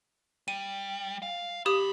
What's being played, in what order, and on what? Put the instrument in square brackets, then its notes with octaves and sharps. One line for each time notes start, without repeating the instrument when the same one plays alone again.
[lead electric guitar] G3 [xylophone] D#7
[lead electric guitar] F5
[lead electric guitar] F3 B5 [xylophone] G4 D#6